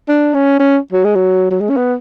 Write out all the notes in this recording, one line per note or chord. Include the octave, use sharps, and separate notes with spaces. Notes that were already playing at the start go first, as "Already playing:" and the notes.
D4
C#4
C#4
F#3
G#3
F#3
F#3
G#3
C#4
B3